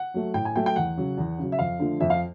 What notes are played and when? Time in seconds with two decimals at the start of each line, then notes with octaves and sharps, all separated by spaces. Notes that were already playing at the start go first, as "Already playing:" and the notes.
Already playing: F#5
0.14 F#3 A3
0.34 A2 G5
0.45 G#5
0.56 F#3 A3 G5
0.66 G5
0.76 E2 F#5
0.97 C#3 F#3
1.18 E2
1.38 C#3 F#3
1.52 E5
1.59 F2 F5
1.79 D3 F3 A3
2.00 F2 E5
2.10 F5